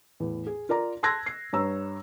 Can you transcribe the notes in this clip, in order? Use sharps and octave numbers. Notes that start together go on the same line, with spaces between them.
E2 A2
G#4
F4 A#4 D5 A#5
A5 C6 E6 F#6 G#6 A#6
C7
G2 C#5 A#5 E6